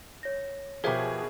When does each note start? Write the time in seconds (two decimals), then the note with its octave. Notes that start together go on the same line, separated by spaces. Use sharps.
0.23 C#5 A#6
0.84 B2 F3 G4 G#4 A#4 C5 E5